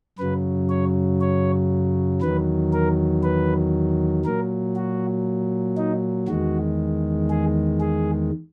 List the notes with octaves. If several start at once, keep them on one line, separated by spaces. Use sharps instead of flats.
F#2 C#3 F#3 B4
C#5
C#5
E2 D#3 F#3 B4
A#4
B4
A#2 F#3 A#4
F#4
D#4
E2 D#3 G#3 F#4
G#4
G#4